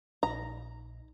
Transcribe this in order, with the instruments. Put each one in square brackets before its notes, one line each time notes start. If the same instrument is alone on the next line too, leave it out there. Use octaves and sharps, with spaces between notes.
[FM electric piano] A#1 D#4 [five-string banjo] A#5